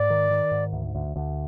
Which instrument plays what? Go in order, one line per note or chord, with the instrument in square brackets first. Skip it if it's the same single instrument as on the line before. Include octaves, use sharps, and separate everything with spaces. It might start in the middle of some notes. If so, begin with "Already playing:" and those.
Already playing: [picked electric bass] G#2 [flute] D5
[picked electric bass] D#3
D#3
G#2
D2
D2
D2